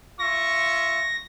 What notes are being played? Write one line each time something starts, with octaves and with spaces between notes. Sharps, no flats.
F4 E5 C#6 A#6